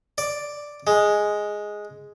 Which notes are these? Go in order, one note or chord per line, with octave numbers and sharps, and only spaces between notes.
D5
G#3